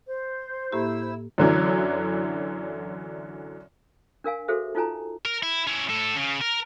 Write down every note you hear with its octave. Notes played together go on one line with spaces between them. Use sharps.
C5
A2 A#3 E4 G4 E6
F#2 D3 E3 F#3
D4 A#4 F5 G#5
F#4 G#4 A4 C5 E5
D#4 F4 A4 C#5 G#5 A#5
A#4
E4
C#4 E4
A2 A4
C#3
A#4